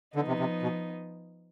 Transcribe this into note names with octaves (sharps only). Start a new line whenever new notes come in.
D3 F3 B3 D#4
C3
C3
B2